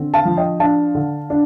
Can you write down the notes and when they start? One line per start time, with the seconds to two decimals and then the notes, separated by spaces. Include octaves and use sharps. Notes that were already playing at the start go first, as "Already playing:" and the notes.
Already playing: D3 C4
0.14 F5 A5
0.25 F3
0.37 D#5 G5
0.60 D4 F5 A5
0.95 D3
1.30 D4